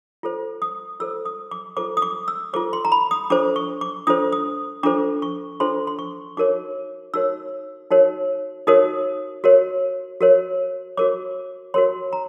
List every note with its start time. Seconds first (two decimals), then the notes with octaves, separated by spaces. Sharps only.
0.23 F4 A4 C5
0.62 D#6
1.00 F4 A4 C5 E6
1.25 D#6
1.51 D6
1.77 F4 A4 C5 D6
1.97 D#6
2.02 D6
2.28 E6
2.53 F4 A4 C5 D6
2.73 C6
2.85 A#5
2.92 B5
3.11 D#6
3.30 D4 F4 A4 C5 D6
3.56 C#6
3.81 D6
4.07 D4 F4 A4 C5 D#6
4.32 D#6
4.83 D4 F4 A4 C5 D6
5.22 C#6
5.60 D4 F4 A4 C5 C6
5.87 C6
5.99 C#6
6.37 D#4 F#4 A#4 C#5 D6
7.14 D#4 F#4 A#4 C#5 E6
7.91 D#4 F#4 A#4 C#5
8.67 D#4 F#4 A#4 C#5 D#6
9.44 F#4 A#4 C#5
10.21 F#4 A#4 C#5
10.97 F#4 A#4 C#5 D6
11.74 F#4 A#4 C#5 C6
12.13 A#5